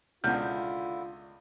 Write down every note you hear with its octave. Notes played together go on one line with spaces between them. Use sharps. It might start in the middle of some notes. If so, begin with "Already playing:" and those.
C#2 B2 D3 E4 F4 F#5 F6 G6